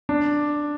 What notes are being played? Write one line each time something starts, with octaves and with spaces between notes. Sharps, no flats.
D4